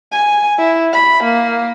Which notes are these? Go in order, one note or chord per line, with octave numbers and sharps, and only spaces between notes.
G#5
E4
B5
A#3